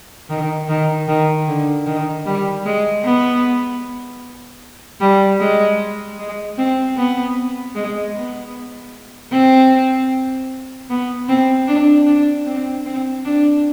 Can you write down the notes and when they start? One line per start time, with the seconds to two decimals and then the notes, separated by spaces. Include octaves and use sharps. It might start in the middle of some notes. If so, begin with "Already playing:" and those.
0.29 D#3
0.69 D#3
1.08 D#3
1.47 D3
1.86 D#3
2.25 G3
2.65 G#3
3.05 B3
5.01 G3
5.40 G#3
6.19 G#3
6.58 C4
6.97 B3
7.75 G#3
8.15 B3
9.32 C4
10.90 B3
11.29 C4
11.67 D4
12.06 D4
12.46 C4
12.85 C4
13.25 D4